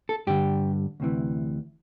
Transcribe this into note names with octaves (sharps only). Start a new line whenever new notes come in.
A4
G2 D3 G3 G4
D2 C3 E3